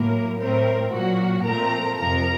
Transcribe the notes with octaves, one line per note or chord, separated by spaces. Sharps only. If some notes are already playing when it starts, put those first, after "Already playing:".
Already playing: A2 F#3 A#3 A#4
A2 A3 C4 A#4
A#2 F#3 A#3 F#4 F#5
A#2 F3 A3 C4 A#4 A#5
F2 C3 F3 A#4 A#5